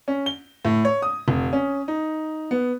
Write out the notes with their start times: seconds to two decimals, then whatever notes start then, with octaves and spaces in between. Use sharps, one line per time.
0.08 C#4
0.26 G7
0.65 A2
0.85 C#5
1.02 D#6
1.28 F1
1.53 C#4
1.88 D#4
2.51 B3